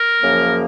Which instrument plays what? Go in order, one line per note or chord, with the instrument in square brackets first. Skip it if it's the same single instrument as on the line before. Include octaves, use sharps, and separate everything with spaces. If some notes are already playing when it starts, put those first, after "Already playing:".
Already playing: [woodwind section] A#4
F#2 C#3 F3 A#3